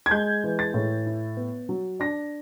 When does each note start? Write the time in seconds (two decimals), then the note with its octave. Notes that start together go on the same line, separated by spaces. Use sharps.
0.06 G#6
0.11 G#3 G6
0.44 E3
0.59 A6
0.74 A2
1.06 E4
1.37 B3
1.69 F#3
2.00 D4 A#6